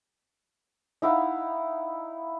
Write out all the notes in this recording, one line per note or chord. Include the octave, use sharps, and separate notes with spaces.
D#4 E4 F5 F#5